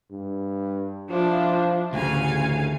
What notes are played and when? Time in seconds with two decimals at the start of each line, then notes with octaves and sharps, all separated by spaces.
0.11 G2
1.10 F3 D4 E4 F4
1.93 A1 D2 C#3 F5 G#5